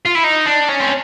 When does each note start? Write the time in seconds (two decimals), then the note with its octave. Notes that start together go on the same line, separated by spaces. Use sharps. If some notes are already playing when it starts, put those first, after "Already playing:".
0.05 F4
0.15 E4
0.24 D#4
0.46 D4
0.68 C#4
0.80 C4